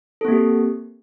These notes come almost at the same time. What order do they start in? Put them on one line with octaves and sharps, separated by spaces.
A4 C4 A#3 G4